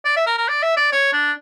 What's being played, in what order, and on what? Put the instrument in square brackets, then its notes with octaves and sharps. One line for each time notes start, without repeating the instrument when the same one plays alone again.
[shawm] D5
E5
A#4
A#4
D5
E5
D5
C#5
D4